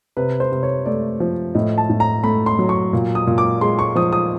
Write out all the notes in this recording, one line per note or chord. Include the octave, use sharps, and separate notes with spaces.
C3 B4
C5
C3
C#5
A3 D5
F3
A2 D#5
A5
A2
A#5
A3 B5
C6
F#3
C#6
A#2
D#6
A#2
D6
G#3 C6
C#6
F3 D#6
D#6